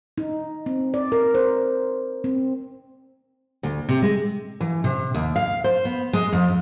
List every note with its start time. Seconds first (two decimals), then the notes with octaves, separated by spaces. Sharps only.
0.18 D#4
0.66 C4
0.94 D5
1.12 A#4
1.34 C5
2.24 C4
3.63 D2
3.89 C3
4.02 G#3
4.61 E3
4.84 C3
5.15 D#2
5.36 F5
5.64 C5
5.85 B3
6.13 G#3
6.33 F2